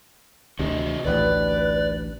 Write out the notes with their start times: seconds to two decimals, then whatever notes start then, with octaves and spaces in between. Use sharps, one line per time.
0.59 D2 C3 F#4 G#4 D#5
1.05 A1 D2 B4 D5